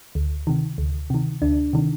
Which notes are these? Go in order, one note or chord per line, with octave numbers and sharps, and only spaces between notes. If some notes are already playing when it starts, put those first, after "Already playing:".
D2
C3 D#3
D2
C3 D#3
D2 D4
C3 D#3